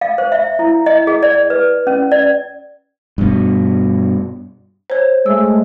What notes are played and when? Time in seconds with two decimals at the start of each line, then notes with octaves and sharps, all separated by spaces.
0.01 F5
0.18 C5
0.32 E5
0.59 E4
0.86 D#5
1.07 G#4
1.23 D5
1.50 B4
1.87 C#4
2.12 D5
3.18 G2 B2
4.90 C5 C#5
5.26 G#3 A3 E6